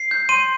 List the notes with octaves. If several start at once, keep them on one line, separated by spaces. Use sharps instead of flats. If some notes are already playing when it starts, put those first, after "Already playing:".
Already playing: C7
G6
C6 D#7